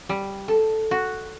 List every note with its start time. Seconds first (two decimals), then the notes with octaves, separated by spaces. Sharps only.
0.09 G3
0.48 A4
0.91 F#4